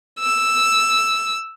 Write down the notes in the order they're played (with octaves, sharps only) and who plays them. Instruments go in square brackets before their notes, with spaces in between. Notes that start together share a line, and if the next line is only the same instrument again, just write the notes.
[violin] E6